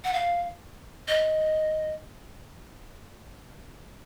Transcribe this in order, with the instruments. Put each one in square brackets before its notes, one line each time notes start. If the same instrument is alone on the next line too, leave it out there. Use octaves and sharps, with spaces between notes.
[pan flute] F#5
F5
D#5